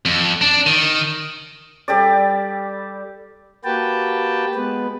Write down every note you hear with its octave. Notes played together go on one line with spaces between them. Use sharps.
F2
D4
D#3
G3 G4 A4 D5
A#3 F#4 G4 B4 G5 A5
G#3 B3 B4